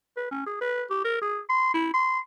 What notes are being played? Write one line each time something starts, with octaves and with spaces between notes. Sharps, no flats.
B4
C#4
G#4
B4
G4
A#4
G#4
C6
E4
C6